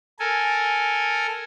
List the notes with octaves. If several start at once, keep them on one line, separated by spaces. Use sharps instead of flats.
A4 A#4 G#5